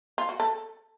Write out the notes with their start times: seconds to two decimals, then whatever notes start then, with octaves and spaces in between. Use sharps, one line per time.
0.18 F4
0.29 F#4
0.40 A4